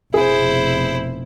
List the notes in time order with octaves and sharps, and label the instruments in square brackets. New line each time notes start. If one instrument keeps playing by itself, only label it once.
[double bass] F1 B2 [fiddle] E4 C5 [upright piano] G#4